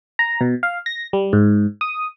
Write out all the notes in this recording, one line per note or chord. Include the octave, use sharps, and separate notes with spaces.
A#5
B2
F5
A#6
G3
G#2
D#6